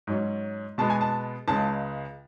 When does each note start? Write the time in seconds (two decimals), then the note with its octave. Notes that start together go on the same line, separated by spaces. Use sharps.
0.07 G#2 F#3 C#4
0.78 B2 G#3 B3 A5
0.90 G#5
1.01 A5
1.48 C#2 C#3 G#3 A5